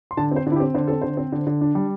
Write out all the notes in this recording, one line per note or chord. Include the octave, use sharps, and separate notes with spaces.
C6
D3 A5
C4 C5
D3
E4
G4
C4
D3 C5
C4 A4
D3 C5
C4
D3
D3
D4
G3